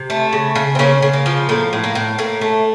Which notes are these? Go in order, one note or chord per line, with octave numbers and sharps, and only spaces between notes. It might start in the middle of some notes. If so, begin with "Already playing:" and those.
Already playing: C3
A3
C#3
C#3
C4
C#3 A#3 C#4
C#3
A#3
F3
A2 A#3
A2
A#3
A2
A2 A#3
A3